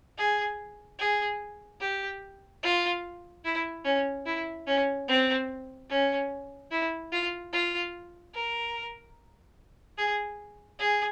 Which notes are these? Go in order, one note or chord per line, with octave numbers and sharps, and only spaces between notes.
G#4
G#4
G4
F4
E4
C#4
E4
C#4
C4
C#4
E4
F4
F4
A#4
G#4
G#4